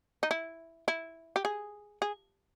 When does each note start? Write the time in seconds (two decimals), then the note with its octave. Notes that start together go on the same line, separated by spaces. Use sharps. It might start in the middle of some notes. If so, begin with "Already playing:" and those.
0.23 D#4
0.31 E4
0.88 E4
1.36 G4
1.45 G#4
2.02 G#4